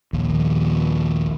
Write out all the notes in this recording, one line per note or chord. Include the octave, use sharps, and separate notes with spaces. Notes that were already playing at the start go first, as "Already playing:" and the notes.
A#1 D#2